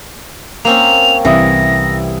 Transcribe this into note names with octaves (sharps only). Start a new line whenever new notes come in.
A#3 C4 C#4 F7
C2 E3 E5 D#6 A#6